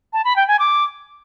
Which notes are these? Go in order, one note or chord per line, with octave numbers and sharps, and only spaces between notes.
A5
B5
G5
G#5
D6